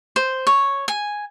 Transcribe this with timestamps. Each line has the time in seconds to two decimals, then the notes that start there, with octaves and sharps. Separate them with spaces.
0.16 C5
0.47 C#5
0.88 G#5